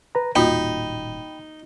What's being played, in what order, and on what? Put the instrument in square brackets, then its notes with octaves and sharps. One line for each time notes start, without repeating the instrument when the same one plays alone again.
[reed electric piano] B4 A#5
[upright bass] D#1 A1 [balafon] A#3 F4 F#4 [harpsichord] D#4 [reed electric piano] G5 B5